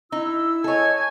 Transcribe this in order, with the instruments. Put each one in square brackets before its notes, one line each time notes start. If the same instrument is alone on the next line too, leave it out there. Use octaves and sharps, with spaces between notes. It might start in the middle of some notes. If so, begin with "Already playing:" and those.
[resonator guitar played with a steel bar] D#4 [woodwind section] E4 E6
[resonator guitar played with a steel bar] A4 C#5 [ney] D#5 [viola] G#5